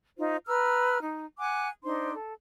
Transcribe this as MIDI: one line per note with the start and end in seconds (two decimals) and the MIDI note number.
0.18 0.37 63
0.18 0.37 65
0.18 0.37 72
0.46 0.98 71
0.46 0.98 82
0.46 0.98 88
0.46 0.98 89
1.01 1.25 63
1.39 1.68 78
1.39 1.68 80
1.39 1.68 86
1.39 1.68 90
1.83 2.14 62
1.83 2.14 63
1.83 2.14 72
1.83 2.14 84
2.14 2.33 69